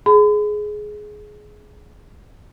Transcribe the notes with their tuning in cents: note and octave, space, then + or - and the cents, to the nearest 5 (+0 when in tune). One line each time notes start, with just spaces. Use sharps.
G#4 +15 B5 +45